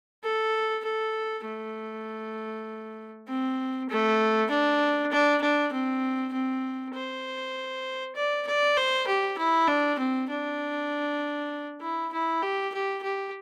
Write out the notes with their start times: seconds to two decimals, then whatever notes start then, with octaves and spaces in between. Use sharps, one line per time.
0.24 A4
0.85 A4
1.46 A3
3.28 C4
3.90 A3
4.50 D4
5.11 D4
5.41 D4
5.73 C4
6.33 C4
6.95 C5
8.16 D5
8.47 D5
8.77 C5
9.07 G4
9.38 E4
9.68 D4
9.99 C4
10.29 D4
11.81 E4
12.12 E4
12.42 G4
12.74 G4
13.03 G4